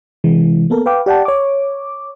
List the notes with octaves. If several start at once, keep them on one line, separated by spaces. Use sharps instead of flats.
C3 E3 G#3
A#3 B3 A4 A#4
B4 F5 G5 D6
G4 D5 F#5 G5 A5
C#5 D6